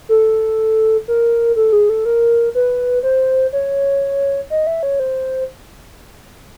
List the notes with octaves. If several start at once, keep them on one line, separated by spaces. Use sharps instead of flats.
A4
A#4
A4
G#4
A4
A#4
B4
C5
C#5
D#5
E5
C#5
C5